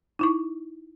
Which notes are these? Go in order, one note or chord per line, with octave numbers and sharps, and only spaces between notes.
D#4 E4 C#6